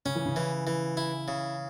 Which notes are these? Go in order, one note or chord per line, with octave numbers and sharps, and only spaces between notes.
C#3 C#4
E3
C#3
E3
E3
E4
C#3